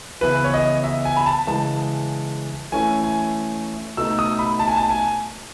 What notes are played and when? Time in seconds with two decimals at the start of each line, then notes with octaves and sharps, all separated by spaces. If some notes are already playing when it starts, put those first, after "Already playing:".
0.21 C#3 E3 B3 E4 B4
0.44 C#5
0.54 D#5
0.84 E5
1.05 G#5
1.16 B5
1.26 A5
1.47 C#3 E3 G#3 A5
2.72 E3 A3 C#4 E4 G#5
3.04 G#5
3.97 B2 A3 D#4 E6
4.19 D#6
4.39 B5
4.59 A5
4.68 G#5
4.76 A5
4.91 G#5